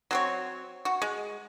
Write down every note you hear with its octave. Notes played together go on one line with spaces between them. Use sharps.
F#3 C4 C#5
F#4
G#3